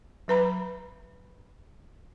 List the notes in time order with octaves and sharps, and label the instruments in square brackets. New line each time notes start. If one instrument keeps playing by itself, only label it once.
[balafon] F#3 B4 A#5 B5